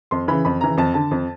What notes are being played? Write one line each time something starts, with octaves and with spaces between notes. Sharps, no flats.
F2 C6
C#3 E3 B5
F2 B5
C#3 E3 A#5
F2 A5
D3 A5
F2